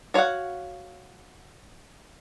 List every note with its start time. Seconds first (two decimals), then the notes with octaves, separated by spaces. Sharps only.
0.14 F#4 C#5 D#5 F5 F#5